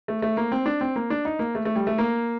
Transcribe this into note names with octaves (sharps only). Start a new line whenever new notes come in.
A3
A3
A#3
C4
D4
C4
A#3
D4
D#4
A#3
A3
A3
G3
A3
A#3